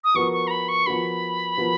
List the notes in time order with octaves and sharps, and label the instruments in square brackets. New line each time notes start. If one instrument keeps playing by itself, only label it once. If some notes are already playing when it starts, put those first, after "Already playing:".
[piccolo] D#6
[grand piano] F3 B3 F#4 A#4 [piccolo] C#6
[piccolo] C#6
A#5
B5
C#6
[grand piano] F3 B3 F#4 A#4 [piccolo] B5
[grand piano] F3 B3 F#4 A#4